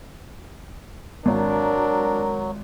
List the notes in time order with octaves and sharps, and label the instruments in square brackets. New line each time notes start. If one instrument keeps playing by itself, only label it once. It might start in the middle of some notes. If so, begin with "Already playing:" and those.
[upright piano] G#1 [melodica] F#3 [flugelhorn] D4 [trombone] A#4